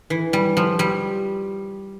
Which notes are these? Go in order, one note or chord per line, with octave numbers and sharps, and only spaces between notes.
E3
G3
F3
G3